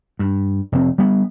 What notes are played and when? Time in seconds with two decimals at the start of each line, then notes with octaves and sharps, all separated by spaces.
0.19 G2
0.72 F1 C4
0.98 G3 B3